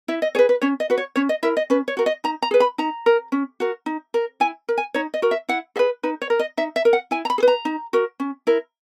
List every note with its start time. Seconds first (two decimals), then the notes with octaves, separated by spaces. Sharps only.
0.08 E4 E5
0.22 D#5
0.35 G#4 B4 C#5
0.49 B4
0.62 C#4 C#5
0.80 D#5
0.90 F#4 B4
0.97 C#5
1.16 C#4 C#5
1.29 D#5
1.43 E4 A#4 E5
1.57 D#5
1.70 C#4 B4
1.88 C#5
1.97 F#4 A#4
2.06 D#5
2.24 D#4 A#5
2.42 A#5
2.51 G#4 B4
2.60 B5
2.78 D#4 A#5
3.06 A#4
3.32 C#4
3.60 F#4 A#4
3.86 D#4
4.14 A#4
4.40 E4 G#5
4.69 A#4
4.78 G#5
4.94 D#4 C#5
5.14 D#5
5.22 F#4 A#4
5.31 E5
5.49 E4 F#5
5.76 G#4 E5
5.79 B4
6.03 D#4 B4
6.22 C#5
6.30 A#4
6.39 D#5
6.57 D#4 E5
6.76 E5
6.85 A#4
6.93 F#5
7.11 E4 G#5
7.25 A#5
7.30 B5
7.38 G#4
7.43 B4 A#5
7.65 D#4
7.93 F#4 A#4
8.20 C#4
8.47 E4 A#4